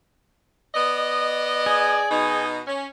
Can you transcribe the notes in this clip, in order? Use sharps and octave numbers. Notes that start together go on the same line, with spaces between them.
B3 D5 D#5
G#4
B2 D#4
C#4